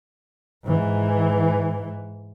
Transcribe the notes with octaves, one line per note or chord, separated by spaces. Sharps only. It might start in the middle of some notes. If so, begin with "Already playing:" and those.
G#2 E3